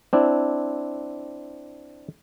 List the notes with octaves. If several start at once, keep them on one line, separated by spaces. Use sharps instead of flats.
C4 D4 E4